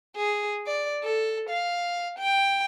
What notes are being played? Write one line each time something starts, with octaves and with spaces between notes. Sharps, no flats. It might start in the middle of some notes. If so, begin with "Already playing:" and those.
G#4
D5
A4
F5
G5